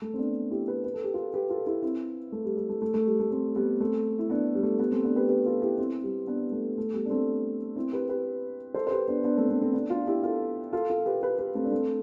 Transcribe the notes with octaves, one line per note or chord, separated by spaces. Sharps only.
A3
C4
B3 D4
E4 G4
G4 B4
B4
A4
G4
F4 A4
G4 B4
F4 A4
E4 G4
C4 E4
A3
G3
G3
A3
A3
A3
G3
A3
A3 C4
G3 B3
A3 C4
E4
B3 D4
G3
A3
G3 B3
A3 C4
B3 D4
G4 B4
G4 B4
F4 A4
E4 G4
C4 E4
G3
B3 D4
A3
A3
G3 B3
D4
A3 C4
C4 E4
G4 B4
G4 B4
A4 C5
C5
G4 B4
B3 D4
B3 D4
A3 C4
A3 C4
A3 C4
B3 D4
D4 F4
E4 G4
F4 A4
F4 A4
F4 A4
G4 B4
G4 B4
G4 B4
A3 C4
D4
A3 C4